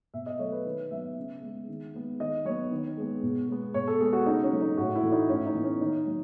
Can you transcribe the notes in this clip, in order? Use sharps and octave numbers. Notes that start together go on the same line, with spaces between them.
B2 E5
D#5
F#3 A3 C#5
B4
D#3 B4
F#3 B3 E5
C#3
G#3 B3
D#3
G#3 B3
D#3 D#5
F#3 B3 C#5
D#3
G#3 B3
B2
G#3 B3
B2 C#5
A4
G#3 B3 G#4
F#4
C#3 D#4
C#4
F#3 A3
D#4
A2 F#4
E4
E3 A3
D#4
A2 C#4
D#4
E3 B3
C#4
D#3 D#4
F#3